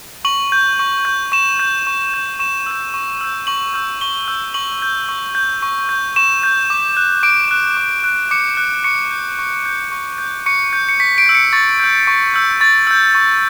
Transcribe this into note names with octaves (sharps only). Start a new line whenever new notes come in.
C#6 F#7
G6
C#6
G6
C#6 E7
G6
C#6
G6
C#6 E7
E6 G6
C#6
E6 G6
C#6 F#7
E6 G6
C#6 G7
E6 G6
C#6 F#7
G6
C#6
G6
C#6
G6
C#6 E7
G6
D6
F#6
D6 D7
F#6
D6
F#6
D6 C#7
F#6
C#6 C#7
G6
C#6
G6
C#6
G6
C#6 C#7
G6
C#7
C#6 B6
D7
E6 G6
C#7
C#6 A6
E6 G6
C#6
E6 G6
C#6 A6
E6 G6
C#6